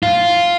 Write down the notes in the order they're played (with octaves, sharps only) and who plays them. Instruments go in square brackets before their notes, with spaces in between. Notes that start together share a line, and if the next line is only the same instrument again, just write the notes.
[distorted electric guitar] F4